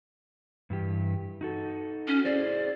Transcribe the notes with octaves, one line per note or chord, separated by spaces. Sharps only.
G2 E3 G4
D#4 F#4 A4
C#4
E4 G#4 C5 D5